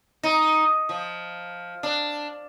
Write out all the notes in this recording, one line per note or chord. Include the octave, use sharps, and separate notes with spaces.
D#4
F3
D4